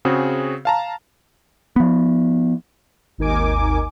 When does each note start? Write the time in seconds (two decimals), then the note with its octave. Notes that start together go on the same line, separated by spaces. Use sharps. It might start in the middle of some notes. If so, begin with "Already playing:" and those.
0.05 C#3 C4 F#4 G#4
0.65 F5 A5 A#5
1.76 F3 B3
3.18 G#1 D#2 D#4 A#4 G#5 D6